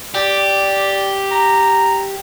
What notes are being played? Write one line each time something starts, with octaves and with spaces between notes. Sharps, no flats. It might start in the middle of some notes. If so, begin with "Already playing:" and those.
G4 D5
A#5